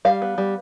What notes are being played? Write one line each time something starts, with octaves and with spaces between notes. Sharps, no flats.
G3 F5
B3
G3